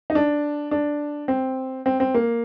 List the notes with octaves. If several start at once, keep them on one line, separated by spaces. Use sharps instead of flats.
D#4
D4
D4
C4
C4
C4
A#3